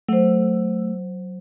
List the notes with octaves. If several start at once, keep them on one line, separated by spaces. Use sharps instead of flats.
F#3 A3 C5